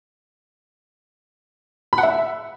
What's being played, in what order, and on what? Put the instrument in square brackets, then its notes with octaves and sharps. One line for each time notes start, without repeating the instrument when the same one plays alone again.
[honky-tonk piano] B5
F#5
E5